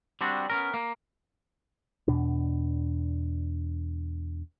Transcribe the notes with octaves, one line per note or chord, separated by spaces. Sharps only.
G3 C4 D4 F#4
B3 C#4 A#4
A#3
E2 B2 D4